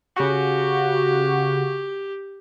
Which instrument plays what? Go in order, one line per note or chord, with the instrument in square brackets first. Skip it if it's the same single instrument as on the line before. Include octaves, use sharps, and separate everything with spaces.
[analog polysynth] C#3 F#4 [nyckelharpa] G4